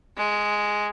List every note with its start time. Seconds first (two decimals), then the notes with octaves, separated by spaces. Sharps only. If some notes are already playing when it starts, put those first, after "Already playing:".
0.17 G#3